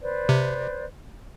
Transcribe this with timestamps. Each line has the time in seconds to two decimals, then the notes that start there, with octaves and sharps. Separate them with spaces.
0.02 B4 C5 D5
0.29 C3